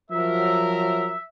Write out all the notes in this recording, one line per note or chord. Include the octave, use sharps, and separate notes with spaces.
F3 F#3 A#4 E5